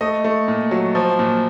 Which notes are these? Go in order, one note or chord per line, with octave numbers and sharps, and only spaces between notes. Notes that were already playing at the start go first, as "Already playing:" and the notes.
A3 D#5
A3
A#2
F#3
F3
A#2